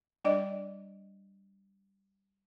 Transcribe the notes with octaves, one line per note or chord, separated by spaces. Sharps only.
G3 D4 D5 D#5